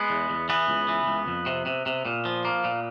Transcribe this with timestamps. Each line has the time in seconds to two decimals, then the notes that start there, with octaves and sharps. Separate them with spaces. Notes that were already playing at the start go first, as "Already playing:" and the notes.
Already playing: G#3 B3
0.10 E2
0.30 E2
0.49 E3 B3
0.68 C#2
0.88 E3
1.07 C#2
1.28 F2
1.46 C3
1.66 C3
1.86 C3
2.05 A#2
2.25 F3
2.45 A#3
2.64 A#2